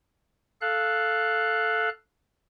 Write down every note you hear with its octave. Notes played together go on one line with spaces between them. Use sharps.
A4 F5 F#6